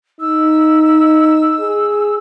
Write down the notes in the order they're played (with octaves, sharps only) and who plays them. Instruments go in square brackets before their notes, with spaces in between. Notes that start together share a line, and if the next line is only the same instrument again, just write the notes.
[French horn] D#4 [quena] E6
[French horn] G#4